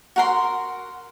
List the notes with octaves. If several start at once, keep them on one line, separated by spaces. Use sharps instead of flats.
F#4 A#4 C6